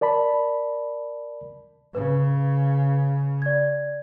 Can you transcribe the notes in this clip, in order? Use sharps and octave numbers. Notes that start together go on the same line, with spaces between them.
A#4 D5 A5 B5
C#3 B4
D5 G#6